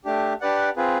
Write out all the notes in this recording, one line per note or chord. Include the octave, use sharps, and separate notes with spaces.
A3 D4 G4
D4 G4 B4 D5 F#5
C4 F4 G#4 B4